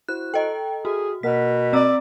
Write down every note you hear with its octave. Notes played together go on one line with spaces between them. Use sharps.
E4 F#4 C5 F#6
A4 D#5 G5 A#5
F#4 G#4
B2 A#3 A#4 F#5 B6
C4 D5 A#5 E6